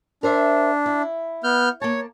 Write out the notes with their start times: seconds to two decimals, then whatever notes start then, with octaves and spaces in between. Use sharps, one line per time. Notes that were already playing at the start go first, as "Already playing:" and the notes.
0.23 D4 A#4 C5 E5
0.86 E4
1.44 B3 F6 G6
1.81 A#3 C#5 A5